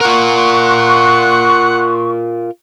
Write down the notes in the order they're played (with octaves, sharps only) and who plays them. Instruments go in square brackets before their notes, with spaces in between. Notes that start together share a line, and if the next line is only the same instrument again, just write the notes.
[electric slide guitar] F4 A#4 [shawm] F#5 [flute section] C6 C#6